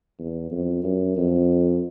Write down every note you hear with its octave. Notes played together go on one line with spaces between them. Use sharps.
E2
F2
F#2
F2